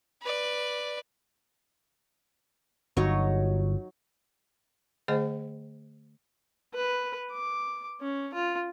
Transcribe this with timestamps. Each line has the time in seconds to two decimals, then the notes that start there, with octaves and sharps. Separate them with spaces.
0.22 B4 D5
2.97 G1 F#3 D#4 C#5
5.08 D3 A3 G#4 C5 D#5 G5
6.74 B4
7.31 D6
8.01 C#4
8.34 F4